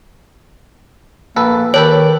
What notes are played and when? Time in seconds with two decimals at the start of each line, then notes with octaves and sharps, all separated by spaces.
1.36 A#1 A#3 A4 B4
1.74 D#3 G4 A4 B4 C#5